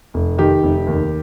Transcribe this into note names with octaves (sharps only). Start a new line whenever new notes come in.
F1
D#3 G4
F1
D#2